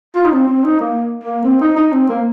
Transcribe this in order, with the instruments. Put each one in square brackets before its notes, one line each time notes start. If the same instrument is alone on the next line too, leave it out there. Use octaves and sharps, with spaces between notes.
[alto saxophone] F4
D#4
C4
C4
D#4
A#3
A#3
C4
D#4
D#4
C4
A#3